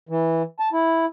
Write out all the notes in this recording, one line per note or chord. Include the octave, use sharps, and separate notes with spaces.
E3
A5
E4